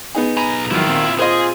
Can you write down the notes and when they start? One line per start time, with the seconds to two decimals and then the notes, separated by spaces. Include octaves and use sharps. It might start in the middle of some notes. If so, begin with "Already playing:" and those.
0.15 B3 D#4 G#4
0.37 B1 G#5 A#5 B5 D#7
0.71 G#2 D#3 F3 F#3 E4 F4
0.86 A#2 C4
1.19 F4 G#4 C5 D#5